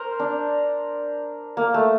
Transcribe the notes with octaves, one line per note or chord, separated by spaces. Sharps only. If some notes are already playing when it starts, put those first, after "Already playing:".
Already playing: A#4 C5
D4
A#3
A3